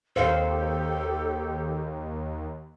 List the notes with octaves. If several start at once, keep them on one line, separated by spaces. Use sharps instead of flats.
D#2 G4 A4 C5 F5